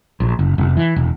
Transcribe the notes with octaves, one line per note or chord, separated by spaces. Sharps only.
A#1
F#1
F1
E3
E1